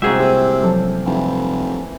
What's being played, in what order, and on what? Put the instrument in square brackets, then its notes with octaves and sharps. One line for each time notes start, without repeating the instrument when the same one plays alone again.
[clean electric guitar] C2 G#4 E5 [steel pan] G#3 F#4 [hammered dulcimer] A#3 C4 G5
[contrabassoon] C3
[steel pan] F3 F#3 A4
[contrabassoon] F1 [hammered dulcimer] E3